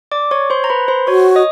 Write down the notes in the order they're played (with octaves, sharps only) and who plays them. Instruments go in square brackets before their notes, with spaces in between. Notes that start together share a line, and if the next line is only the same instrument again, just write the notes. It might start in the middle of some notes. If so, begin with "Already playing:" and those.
[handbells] D5 D6
C#5 C#6
C5 C6
A#5
B4 B5
C5 C6
[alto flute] F#4 [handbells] C#5 C#6
[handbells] D#5 D#6